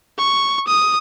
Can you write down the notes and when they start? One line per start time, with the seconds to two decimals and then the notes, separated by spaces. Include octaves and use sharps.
0.18 C#6
0.67 D#6